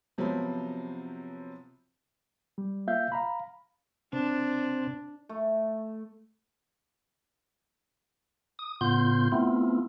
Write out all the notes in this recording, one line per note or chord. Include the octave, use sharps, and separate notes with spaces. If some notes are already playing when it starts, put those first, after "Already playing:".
C3 F3 F#3 B3 C5 B5
G3
A#3 F4 E5 F5 G6
F5 A#5 B5
C3 C4 D4
A3
D#6
A2 C#3 B3 F4 C6 G6
A3 B3 C4 E4 F4